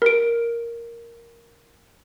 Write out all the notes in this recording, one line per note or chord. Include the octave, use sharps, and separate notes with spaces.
A#4 D7